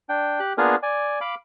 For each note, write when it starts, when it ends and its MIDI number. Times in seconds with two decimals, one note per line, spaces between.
0.09 0.40 62
0.09 0.40 79
0.40 0.53 67
0.40 0.53 90
0.58 0.76 58
0.58 0.76 59
0.58 0.76 62
0.58 0.76 65
0.58 0.76 68
0.58 0.76 70
0.83 1.19 74
0.83 1.19 80
1.21 1.35 77
1.21 1.35 83
1.21 1.35 86